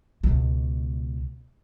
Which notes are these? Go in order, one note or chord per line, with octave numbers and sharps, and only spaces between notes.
C#2 B2